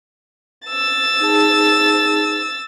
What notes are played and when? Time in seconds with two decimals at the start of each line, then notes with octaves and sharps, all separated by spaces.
0.68 E6 A6
1.20 D#4 G#4 A5